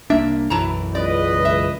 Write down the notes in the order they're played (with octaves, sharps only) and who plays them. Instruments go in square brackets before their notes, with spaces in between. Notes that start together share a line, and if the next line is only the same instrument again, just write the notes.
[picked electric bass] C2 A#3 D4 [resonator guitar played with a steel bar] E5
[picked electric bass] B1 F#2 E3 [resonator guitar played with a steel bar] E4 A5 A#5
[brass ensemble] C#2 B4 D#5 [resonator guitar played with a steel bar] D5
[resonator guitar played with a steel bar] E5